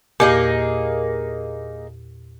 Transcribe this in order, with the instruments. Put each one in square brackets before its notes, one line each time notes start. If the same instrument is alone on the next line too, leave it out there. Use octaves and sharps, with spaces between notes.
[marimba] E2 A#2 G4 [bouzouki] A#3 D#4 G#4